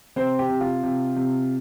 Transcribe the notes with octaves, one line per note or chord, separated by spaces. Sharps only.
C3 C4 C5
G4
C3
F4
C3
C3